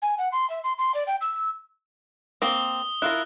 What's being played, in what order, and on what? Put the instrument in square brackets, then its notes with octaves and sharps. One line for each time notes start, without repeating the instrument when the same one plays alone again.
[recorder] G#5
F#5
C6
E5
C6
C6
D5
G5
E6
[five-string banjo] A#3 C4 [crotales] D#6 G7
[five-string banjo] E4 F4 A#4 [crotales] F#6